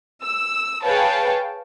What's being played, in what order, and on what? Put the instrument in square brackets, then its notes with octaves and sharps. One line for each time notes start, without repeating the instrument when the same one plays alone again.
[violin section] E6
G#4 B4 C#5 F5 G5 A5